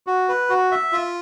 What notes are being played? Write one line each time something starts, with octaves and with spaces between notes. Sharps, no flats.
F#4
B4
F#4
E5
F4